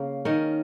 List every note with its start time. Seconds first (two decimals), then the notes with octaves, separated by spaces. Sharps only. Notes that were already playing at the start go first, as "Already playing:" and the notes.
Already playing: C#3 A#3
0.25 D#3 C#4 A#4